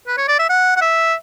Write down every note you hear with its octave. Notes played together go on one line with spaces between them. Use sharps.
B4
C#5
D5
E5
F#5
F#5
E5